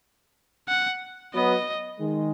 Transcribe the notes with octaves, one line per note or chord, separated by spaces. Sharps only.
F#5
F#3 B3 D#5
D#3 G#3